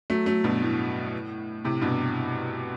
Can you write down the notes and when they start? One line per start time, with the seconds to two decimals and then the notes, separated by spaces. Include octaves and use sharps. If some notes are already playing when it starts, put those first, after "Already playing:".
0.10 F#3 A3
0.26 F#3 A3
0.44 G2 B2
0.62 A2
1.65 A2 C3
1.81 G2 B2